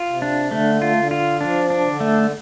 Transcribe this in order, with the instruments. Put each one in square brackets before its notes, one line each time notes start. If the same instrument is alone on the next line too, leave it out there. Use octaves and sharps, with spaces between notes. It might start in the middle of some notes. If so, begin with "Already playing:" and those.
Already playing: [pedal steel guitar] F4
[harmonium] C3
[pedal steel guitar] D4
[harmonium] D3 [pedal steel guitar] A3
[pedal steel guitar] F4
[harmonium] D3
[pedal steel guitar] F4
[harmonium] F3 [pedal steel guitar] D4
[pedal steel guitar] D4
[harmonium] C3
D3
[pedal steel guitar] A3